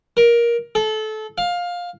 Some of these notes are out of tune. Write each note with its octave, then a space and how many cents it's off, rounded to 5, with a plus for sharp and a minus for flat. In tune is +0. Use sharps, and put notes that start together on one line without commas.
A#4 +15
A4 -25
F5 +15